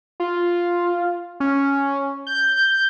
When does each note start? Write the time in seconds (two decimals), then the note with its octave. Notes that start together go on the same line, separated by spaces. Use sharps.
0.20 F4
1.40 C#4
2.27 G6